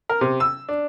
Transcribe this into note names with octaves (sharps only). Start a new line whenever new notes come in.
A#4
C3
E6
D4